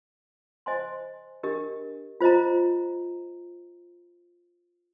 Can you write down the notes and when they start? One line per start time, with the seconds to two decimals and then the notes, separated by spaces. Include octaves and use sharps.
0.66 C5 D#5 G#5 C6
1.43 D4 G4 A#4 D#5
2.21 F4 C5 D#5 A#5